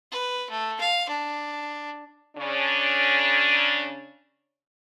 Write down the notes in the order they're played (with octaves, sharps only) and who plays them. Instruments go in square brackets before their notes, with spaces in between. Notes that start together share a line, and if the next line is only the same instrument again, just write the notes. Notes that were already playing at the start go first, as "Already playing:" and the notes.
[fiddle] B4
A3
F5
D4
[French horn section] C#3 C#4 D4